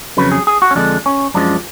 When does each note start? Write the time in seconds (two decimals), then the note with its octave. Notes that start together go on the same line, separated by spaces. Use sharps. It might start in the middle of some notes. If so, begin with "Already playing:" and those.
0.17 F2 C#3 F#3 B4
0.32 G#4
0.47 G#4
0.62 F#4
0.71 C#4
0.75 F2 D3 G#3 D4
1.06 C#4
1.34 F#2 F3 G#3 D4